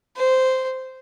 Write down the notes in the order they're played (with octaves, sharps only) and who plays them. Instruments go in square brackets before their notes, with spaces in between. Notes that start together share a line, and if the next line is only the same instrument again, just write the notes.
[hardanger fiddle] C5